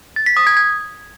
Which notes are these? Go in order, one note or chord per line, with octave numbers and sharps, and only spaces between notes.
A6
B6
D#6
G#6
G#6